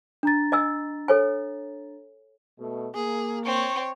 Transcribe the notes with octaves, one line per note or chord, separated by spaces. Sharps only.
D4 A#5 A6
D#5 G#5 E6
A4 C#5 G#5
B2 A3
A#3 G#4
C4 C#5